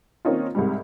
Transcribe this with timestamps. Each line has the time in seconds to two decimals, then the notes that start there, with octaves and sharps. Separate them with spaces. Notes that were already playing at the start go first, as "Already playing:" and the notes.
0.25 D#3 A#3 C4 C#4 D#4 F4
0.55 C2 G#2 G3